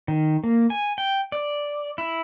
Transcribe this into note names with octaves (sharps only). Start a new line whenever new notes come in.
D#3
A#3
G#5
G5
D5
E4